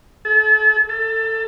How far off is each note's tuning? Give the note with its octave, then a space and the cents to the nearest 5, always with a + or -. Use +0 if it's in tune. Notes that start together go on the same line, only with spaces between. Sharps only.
A4 -35
A4 +20